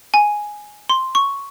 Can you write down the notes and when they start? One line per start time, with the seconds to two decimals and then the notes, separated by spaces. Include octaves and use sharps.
0.14 G#5
0.89 C6
1.15 C#6